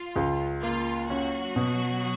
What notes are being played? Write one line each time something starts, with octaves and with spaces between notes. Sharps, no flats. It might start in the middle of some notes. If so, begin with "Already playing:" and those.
Already playing: F4
C#2
A#3 F4
F#3 C#4 F#4
B2